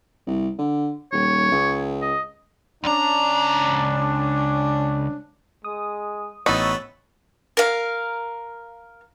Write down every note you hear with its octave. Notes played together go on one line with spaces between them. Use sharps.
C2
D3
D#1 C#5
C#2
D#5
C#2 C#4 D4 A#5
G#3 D#6
A1 B3 D#4 B4 C#5 C#6 E6 A6
A#4 F5